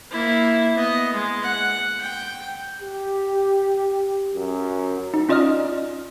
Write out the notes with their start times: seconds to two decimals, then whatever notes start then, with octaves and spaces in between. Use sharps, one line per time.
0.11 A#3 E4
0.74 B3 D#5
1.13 G#3
1.42 F#5
2.01 G5
2.81 G4
4.34 F#2
5.14 D#4
5.29 C#4 F4 D5 D#5 D#6 F6